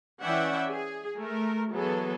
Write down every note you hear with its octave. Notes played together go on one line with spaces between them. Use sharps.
E3 C#4 D5 E5 F#5 G5
G#4
A3 A#4
E3 F#3 B3 G#4 A4